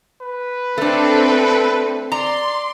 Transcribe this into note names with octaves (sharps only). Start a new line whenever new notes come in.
B4
A3 C4 D4 A4
D5 A#5 C6